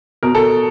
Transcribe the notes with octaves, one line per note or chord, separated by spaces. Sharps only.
B2 A#4
A4